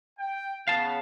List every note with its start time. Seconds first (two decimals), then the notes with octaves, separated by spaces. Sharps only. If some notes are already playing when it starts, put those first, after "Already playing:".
0.19 G5
0.68 C#3 B3 F5 A5